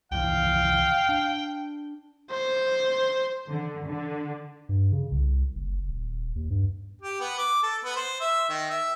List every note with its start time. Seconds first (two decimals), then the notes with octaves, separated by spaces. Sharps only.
0.12 C2 F2 E3 F5 G5
1.09 D4
2.31 C5
3.49 D3
3.86 D3
4.69 G2
4.92 C#3
5.11 C2
5.55 F#1
5.88 D#1
6.36 D#2
6.50 G2
7.02 G4
7.21 B3
7.38 D6
7.63 A4
7.84 B3
7.96 C5
8.21 E5
8.49 D#3
8.70 E5